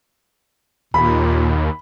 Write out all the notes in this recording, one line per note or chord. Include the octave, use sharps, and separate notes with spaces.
D#2 A#2 B5